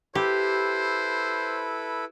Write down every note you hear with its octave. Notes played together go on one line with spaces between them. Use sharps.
E4 G4 A4 B4 C5